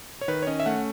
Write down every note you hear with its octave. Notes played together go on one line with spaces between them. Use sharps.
C#5
D#3 B4
C#5
C#4 D#5
E5
A3 F#5